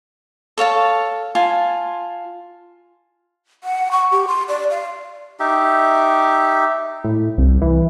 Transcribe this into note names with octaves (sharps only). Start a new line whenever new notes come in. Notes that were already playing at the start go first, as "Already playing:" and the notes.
A4 C#5 F5 A5
F4 G#5 A5
F#5
C#6
G4
C6
D5
F5
D#4 G4 E5
A2
C2
E3